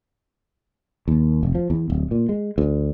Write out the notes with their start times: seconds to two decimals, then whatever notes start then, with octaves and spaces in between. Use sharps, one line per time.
1.08 D#2
1.43 F1
1.55 F3
1.70 E2
1.90 D1
2.11 A#2
2.29 G#3
2.58 D2